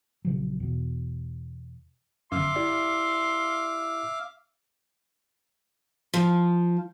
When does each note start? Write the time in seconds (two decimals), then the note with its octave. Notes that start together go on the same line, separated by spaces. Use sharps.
0.25 A#1 C#3 F#3
0.60 E2 B2
2.32 G1 F#2 E5 F5 C6 D6
2.56 E4 G4 D5
6.14 F3